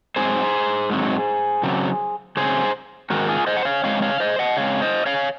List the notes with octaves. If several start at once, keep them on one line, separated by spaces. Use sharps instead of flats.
G#2 F#3 C4 G#4 C5
G#2 F#3 C4
C#3 F#3 C4
C#3 F#3 C4 G#4 C5
G#2 D#3 G#3 C4 F#4 A#4
F4 G#4
C5 D#5
F#5
C#5 F5
G#2 D#3 G#3 C4 C#5 F5
C#5 F5
C5 D#5
D#5 F#5
C#3 G#3 C4 C#5 F5
C5 D#5
C#5 F5